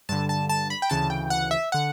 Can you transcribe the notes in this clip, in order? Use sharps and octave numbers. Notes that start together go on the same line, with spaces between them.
G2 D3 A5
A5
A5
B5
G5
D2 C#3 E3 A5
G5
F#5
E5
D3 F#5